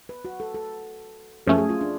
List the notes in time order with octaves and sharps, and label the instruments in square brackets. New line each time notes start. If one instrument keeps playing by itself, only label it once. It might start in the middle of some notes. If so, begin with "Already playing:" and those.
[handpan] B4
F#4
A4
A4
[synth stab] F#2 F3 A3 C#4 [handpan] G#4
[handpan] G#4
F4
D4